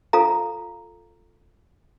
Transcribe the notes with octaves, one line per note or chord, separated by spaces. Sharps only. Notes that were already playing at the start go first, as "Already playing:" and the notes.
F4 A4 F5 A#5